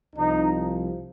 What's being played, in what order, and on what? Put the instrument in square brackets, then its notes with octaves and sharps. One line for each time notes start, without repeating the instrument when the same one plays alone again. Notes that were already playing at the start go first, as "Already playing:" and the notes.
[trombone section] C2 C3 F3 D#4